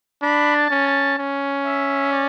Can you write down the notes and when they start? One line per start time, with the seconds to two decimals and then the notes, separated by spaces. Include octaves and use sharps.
0.22 D4 B5
0.55 A5
0.70 C#4
0.87 A5
1.18 C#4
1.65 E5
2.12 D5